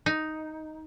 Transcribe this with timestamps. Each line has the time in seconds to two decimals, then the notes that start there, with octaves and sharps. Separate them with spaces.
0.06 D#4